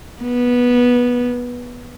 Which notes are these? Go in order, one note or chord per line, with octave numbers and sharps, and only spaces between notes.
B3